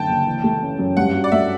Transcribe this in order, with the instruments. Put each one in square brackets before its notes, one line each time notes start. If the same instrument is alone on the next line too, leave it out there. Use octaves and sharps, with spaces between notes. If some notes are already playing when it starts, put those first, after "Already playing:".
Already playing: [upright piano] F#2 D3 A3 [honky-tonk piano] G5 A5
[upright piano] F#1
E3
A3
C#4
F#2
[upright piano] G2 [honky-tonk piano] F#5
[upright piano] F#3
[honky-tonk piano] D5
[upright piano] A3 [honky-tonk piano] E5